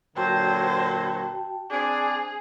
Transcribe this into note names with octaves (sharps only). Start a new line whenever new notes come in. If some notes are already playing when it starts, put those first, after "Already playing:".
A#2 D3 F#3 F#4 C5 G5 A5
C4 D4 G#4